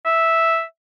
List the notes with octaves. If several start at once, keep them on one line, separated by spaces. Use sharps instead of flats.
E5